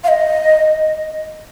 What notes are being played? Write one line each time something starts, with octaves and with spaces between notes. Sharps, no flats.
F5
D#5